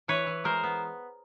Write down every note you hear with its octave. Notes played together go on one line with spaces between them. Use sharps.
E3 B4 C#5
E3
G#3 A#4 C5
B3